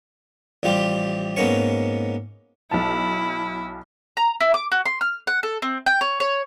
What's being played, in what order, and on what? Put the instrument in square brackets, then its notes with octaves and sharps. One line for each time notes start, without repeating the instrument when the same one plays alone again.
[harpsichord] A1 F3 G3 F4 G4
G#2 A#3 B3 C#4 C#5 C#6
[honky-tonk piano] B1 A5 [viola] E4
[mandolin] A#5
E4
D6
F#4
C6
F6
F#5
A4
C4
G5
C#5
C#5